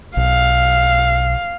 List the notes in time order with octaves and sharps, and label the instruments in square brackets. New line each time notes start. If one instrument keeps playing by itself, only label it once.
[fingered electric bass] B1 [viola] F5